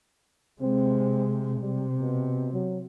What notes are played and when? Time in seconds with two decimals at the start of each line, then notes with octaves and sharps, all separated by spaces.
0.62 C3 G#3 C4
1.61 C3 G3
1.99 B2
2.53 F#3